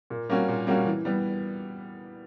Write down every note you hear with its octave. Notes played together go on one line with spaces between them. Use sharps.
A#2
G3 A#3 C#4 F#4
A#2
G3 A#3 C#4 F#4
E3
G3 B3